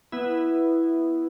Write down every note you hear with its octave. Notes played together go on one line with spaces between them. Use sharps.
B3 E4